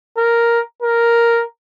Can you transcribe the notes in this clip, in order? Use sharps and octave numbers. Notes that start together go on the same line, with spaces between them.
A#4
A#4